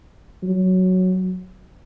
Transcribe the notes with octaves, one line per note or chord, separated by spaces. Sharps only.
F#3